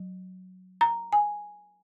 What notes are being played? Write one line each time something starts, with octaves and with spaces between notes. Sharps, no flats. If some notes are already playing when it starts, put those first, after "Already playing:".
Already playing: F#3
A#5
G#5